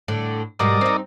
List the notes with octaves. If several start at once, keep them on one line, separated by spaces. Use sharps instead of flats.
A2 D3
G#2 B2 G3 A#4 D5 D#5
C4 D#4